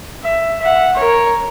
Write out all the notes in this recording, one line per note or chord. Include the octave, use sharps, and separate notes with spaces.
E5
E5 F#5
A#4 C#5